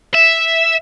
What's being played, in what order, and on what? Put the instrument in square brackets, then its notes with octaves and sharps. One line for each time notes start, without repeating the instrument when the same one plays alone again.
[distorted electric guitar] E5